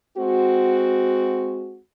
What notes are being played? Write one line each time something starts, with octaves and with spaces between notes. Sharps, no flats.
G#3 C4 F#4